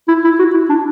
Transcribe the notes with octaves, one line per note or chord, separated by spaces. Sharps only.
E4
E4
F#4
E4
D4